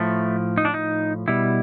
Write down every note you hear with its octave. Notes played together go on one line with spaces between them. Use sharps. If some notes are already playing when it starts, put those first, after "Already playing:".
Already playing: A2 F3 A3
D#4
D4
D#4
B2 G3 E4